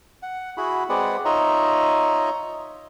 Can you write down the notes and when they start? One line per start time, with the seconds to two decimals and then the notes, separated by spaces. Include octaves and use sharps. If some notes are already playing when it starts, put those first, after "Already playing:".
0.23 F#5
0.57 E4 F#4 G#4 B5
0.89 G#3 C4 G#4 B4 D5 F#5
1.25 D#4 F4 C#5 D#5 E5 A#5